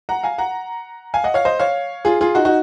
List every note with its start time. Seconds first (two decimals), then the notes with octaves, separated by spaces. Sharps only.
0.09 F#5 A#5
0.23 F5 G#5
0.38 F#5 A#5
1.14 F5 G#5
1.24 D#5 F#5
1.34 C#5 F5
1.45 C5 D#5
1.59 C#5 F5
2.05 F4 G#4
2.21 F4 G#4
2.35 D#4 F#4
2.45 D#4 F#4